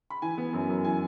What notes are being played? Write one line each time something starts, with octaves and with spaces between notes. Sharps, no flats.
B5
E3 G#5
B3
F#2
F#2
E3 G#5